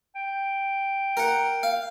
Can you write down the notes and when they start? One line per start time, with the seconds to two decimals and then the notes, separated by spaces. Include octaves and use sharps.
0.15 G5
1.17 A#4 F#5
1.63 F5